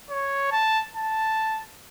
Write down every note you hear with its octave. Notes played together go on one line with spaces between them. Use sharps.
C#5
A5
A5